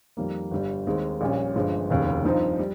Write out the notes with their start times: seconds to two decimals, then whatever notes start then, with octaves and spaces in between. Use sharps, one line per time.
0.17 F2 D#3 G3 A#3
0.51 G1 G2 G3
0.87 D#2 D#3 G#3 C4
1.21 A#1 A#2 G3 C#4
1.55 G1 G2 F3 G#3
1.90 F1 D#2 C#3
2.24 G2 F3 C4 D#4
2.59 G3